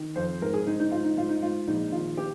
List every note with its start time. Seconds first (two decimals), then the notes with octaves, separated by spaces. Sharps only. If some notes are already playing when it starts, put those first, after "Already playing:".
Already playing: D#3
0.16 F2 C5
0.42 G#2 A#4
0.53 G#4
0.67 G#2 D#4
0.80 D#4
0.91 G#2 F4
1.04 D#4
1.17 G#2 F4
1.29 D#4
1.42 G#2 F4
1.67 A#1 D#4
1.92 D#3 F4
2.17 G4